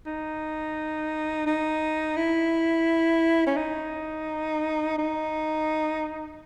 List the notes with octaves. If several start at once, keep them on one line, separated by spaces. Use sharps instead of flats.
D#4
D#4
E4
C#4
D#4
D#4